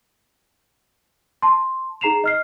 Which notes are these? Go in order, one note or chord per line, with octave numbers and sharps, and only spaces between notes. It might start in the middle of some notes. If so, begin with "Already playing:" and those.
A5 C6
D#4 G#4 A#5 C7 E7 F7
D#5 F6 C7